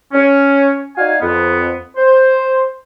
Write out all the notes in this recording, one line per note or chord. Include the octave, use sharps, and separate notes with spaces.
C#4
D#4 F#4 D5 F5 G#5
F2 B3
C5